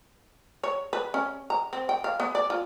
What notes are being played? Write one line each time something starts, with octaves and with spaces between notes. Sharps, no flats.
C#5
B4
C#4
A#5
C4
G5
F5
B3
D5
F4